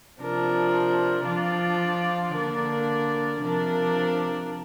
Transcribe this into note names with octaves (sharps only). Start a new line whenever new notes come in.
C3 F3 D4 A#4
F3 D4 F4 D5
D3 A#3 D4 A#4 D5
C3 F3 D4 A#4 D5